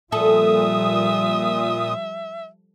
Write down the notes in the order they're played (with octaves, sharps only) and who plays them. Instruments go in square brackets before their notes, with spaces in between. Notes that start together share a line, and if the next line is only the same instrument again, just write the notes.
[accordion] A#2 D#6 [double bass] F3 G3 [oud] A4 [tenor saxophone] E5